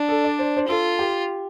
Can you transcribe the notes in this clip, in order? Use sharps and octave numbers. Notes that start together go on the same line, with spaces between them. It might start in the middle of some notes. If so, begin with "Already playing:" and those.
Already playing: D4
A4
D5
C5
C5
F4 A4
G4